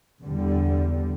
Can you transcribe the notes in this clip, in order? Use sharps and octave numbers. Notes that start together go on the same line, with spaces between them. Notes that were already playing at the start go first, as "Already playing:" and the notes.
E2 D3 G3